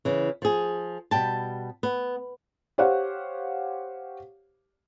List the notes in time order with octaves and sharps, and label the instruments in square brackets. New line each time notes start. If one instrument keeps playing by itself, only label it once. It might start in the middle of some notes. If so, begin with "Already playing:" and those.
[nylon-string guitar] C#3 E3
F3 G#4
B2 G3 G5 A5
B3
[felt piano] G4 C5 C#5 F5 F#5